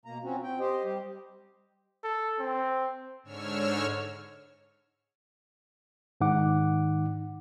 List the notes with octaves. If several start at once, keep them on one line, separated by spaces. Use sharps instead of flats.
B2 A#3 A#5
F3 C4 C#4 F#4
C4 G5
G4 C5 D#5
G3 G4
A4
C4
G#2 D3 C#5 E6 F6
G#2 D#3 D#4 F#5 D6